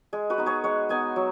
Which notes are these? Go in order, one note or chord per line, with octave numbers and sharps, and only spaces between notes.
G#3 G#4
F#4 B4
B3 D#4
G#4 C#5
G#3 C#5 F#5
B3 D#4 D#5 G#5
F#3